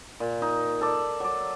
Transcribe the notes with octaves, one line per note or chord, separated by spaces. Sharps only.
A#2
D#4
A4 D5
F#3 D5